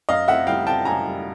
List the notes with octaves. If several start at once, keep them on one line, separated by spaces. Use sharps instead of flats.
F#2 D#5 F5
C4 E5 F#5
G3 F5 G5
C4 G5 A5
F#2 G#5 A#5
G3